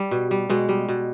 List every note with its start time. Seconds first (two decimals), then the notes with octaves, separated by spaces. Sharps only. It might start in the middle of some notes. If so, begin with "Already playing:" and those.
Already playing: G3
0.11 B2
0.31 G3
0.49 B2 G#3
0.69 G3
0.89 B2